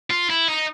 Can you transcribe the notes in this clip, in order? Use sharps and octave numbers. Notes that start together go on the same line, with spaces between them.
F4
E4
D#4